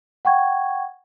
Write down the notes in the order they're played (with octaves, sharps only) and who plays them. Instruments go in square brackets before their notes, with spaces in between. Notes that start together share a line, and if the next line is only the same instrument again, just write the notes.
[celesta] F#5 G5 C#6 G#6